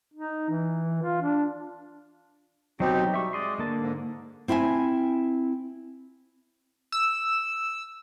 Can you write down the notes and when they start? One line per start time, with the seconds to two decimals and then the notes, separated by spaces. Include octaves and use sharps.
0.14 D#4
0.50 E3
1.02 F4
1.21 D4
2.80 B2 F#3 C4 D#4 G4
3.14 G3 E5 C#6
3.33 G#3 D5 D#5 C6
3.58 D3 A#3 A5
3.82 G#2
4.48 C4 E4 E5 F#5 G#5
6.92 E6